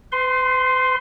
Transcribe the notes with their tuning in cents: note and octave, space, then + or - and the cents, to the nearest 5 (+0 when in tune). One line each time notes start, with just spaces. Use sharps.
B4 +45 C6 +0